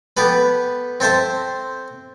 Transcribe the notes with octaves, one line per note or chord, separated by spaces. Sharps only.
B3 G4 A4 B4
C4 A4 C5 E5 A5